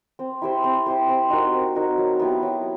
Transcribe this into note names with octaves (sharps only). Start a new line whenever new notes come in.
C4
E4 G4 C5
C4
E4 G4 C5
C4
D#4 F#4 A#4
C4
D#4 F#4 A#4
F#3
B3 E4 G4
F#3